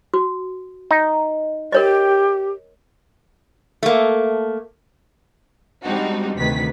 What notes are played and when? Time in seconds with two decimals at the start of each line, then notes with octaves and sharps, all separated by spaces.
0.14 F#4
0.91 D#4
1.72 G4 A#4 C#5 D#5
3.83 A3 A#3
5.84 G3 G#3 C4 D4 D#4 F#4
6.38 D2 C3 D#3 B4 B6